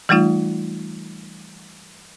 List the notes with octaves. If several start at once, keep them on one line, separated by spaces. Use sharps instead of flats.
E3 G3 A3 D#4 F4